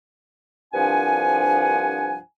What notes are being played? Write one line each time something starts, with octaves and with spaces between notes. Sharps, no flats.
C2 G2 F3 D4 F#5 G#5